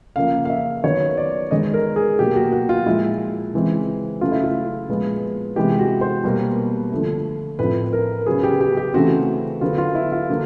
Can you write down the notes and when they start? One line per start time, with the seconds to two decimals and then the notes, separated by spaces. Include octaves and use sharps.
0.16 C#3 F3 A#3 F5
0.45 F5
0.50 E5
0.84 D#3 F#3 B3 C#5
1.17 D5
1.51 D#3 G#3 B3 D#5
1.74 A#4
1.96 G#4
2.19 B2 F#3 A#3 G4
2.36 F#4
2.52 F#4
2.69 F4
2.86 A#2 F3 G#3 E4
3.54 C#3 E3 G#3 C4
4.21 C#3 F#3 A3 F4
4.32 E4
4.44 F4
4.89 A#2 F3 G#3 B3
5.56 C3 E3 G#3 B3 G4
5.79 F#4
6.01 C5
6.24 B2 G3 A#3
6.91 D3 F3 A3
7.59 A2 F3 A3 C4 B4
7.93 A#4
8.26 C#3 F#3 B3 G#4
8.43 G4
8.61 G4
8.77 G4
8.94 C#3 E3 A3 C4 F#4
9.61 D3 F#3 B3 F4
9.78 F4
9.95 E4
10.12 F4
10.29 D3 F#3 A#3